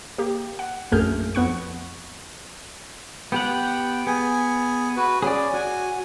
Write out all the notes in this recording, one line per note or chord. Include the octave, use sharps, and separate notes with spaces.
A#3 G4
F#5
A#1 F#2 A3 G#4 F6 G6
F2 B3 F#5 C#6
B3 G4 F#5 G5
B3 G#4 G#5
F#4 B4
C#4 G#4 D5
F#4 G#5